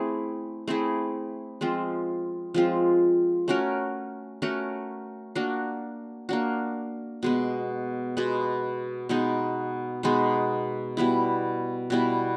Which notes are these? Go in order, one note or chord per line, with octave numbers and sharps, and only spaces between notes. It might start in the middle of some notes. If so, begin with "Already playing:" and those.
Already playing: A3 C4 E4 G#4
A3 C4 E4 G#4
F3 G#3 C4 F4
F3 G#3 C4 F4
A3 C#4 F#4 A#4
A3 C#4 F#4 A#4
A#3 D4 F#4
A#3 D4 F#4
B2 G#3 B3
B2 G#3 B3
B2 G#3 B3 D#4
B2 G#3 B3 D#4
B2 G3 B3 E4
B2 G3 B3 E4